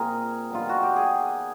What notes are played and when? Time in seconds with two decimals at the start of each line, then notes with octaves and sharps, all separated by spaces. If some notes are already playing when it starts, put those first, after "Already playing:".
Already playing: A#2 C4 G#4 A#4
0.50 D#3 G3 B3 F4
0.69 F#4
0.83 G4
0.96 G#4